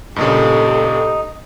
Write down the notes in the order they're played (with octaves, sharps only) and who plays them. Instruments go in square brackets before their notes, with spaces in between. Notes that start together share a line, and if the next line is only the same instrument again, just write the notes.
[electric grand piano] G2 A#2 C#3 [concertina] D#4 [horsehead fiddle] G4 A4